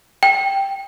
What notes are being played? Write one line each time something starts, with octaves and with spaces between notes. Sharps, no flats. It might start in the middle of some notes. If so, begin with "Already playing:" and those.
G5